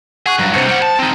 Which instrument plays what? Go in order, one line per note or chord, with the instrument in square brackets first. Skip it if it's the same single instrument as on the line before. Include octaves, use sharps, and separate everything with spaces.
[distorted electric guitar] G#4 [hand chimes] F#5 C#6 F#6
[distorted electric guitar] G2 F#3
[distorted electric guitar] G2 C3 [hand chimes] C5 G6 C#7
[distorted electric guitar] G3 F#5
A5
C4 D#4